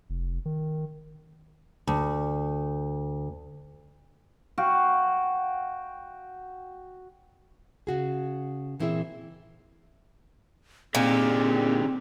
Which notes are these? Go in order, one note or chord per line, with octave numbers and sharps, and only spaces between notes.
F1
D#3
D2
F#4 F5 G5
C#3 F#4 G#4
A#2 E3 C4 E4 G#4 E5
A#2 D3 C4 D#4 G4 G#4